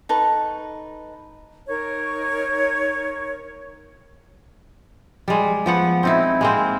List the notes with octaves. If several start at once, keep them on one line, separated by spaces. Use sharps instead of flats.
D#4 A4 B4 C#6
D#4 A#4 C#5 C#6
G3 G#3
F3 B3 F#5
C4 D#4 E4
G#3 A#3 C4